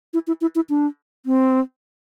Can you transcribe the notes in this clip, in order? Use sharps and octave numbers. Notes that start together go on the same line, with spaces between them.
E4
E4
E4
E4
D4
C4